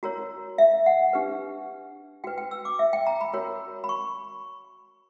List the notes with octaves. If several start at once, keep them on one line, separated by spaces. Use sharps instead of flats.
F#4 A#4 C#5 A#5
E5
F#5
D4 G4 B4
F#4 B4 G5
G5
E6
D6
E5
G5
A#5
B5
F#4 A#4 C#5
B5
C#6